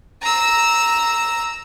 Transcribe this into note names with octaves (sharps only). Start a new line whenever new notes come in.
A#5 E6